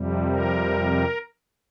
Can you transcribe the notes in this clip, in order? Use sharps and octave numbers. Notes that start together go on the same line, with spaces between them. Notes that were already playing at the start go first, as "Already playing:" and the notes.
Already playing: F2 C3 G3
A#4